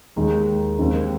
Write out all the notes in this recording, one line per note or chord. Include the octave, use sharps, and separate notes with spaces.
D#2 D#3 G#3 D#4
D#2 D#3 G#3 C4 D#4